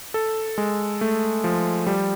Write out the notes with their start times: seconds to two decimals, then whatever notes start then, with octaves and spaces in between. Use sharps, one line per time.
0.14 A4
0.58 G#3
1.01 A3
1.44 F3
1.87 G3